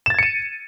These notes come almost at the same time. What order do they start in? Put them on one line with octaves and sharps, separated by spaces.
E7 A6 G#6 C#7 D#7